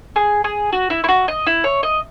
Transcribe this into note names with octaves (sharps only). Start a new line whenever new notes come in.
G#4
G#4
F#4
E4
E4
F#4
D#5
E4
C#5
D#5